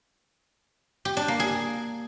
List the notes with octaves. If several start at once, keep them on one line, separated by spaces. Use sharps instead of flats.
G4
D4
A#3
G#4